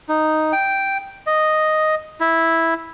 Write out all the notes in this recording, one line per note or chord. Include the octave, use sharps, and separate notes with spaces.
D#4
G5
D#5
E4